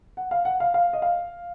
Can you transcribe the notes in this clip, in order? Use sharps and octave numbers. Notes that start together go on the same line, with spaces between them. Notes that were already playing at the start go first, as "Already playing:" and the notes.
F#5
F5
F#5
F5
F5
D#5
F5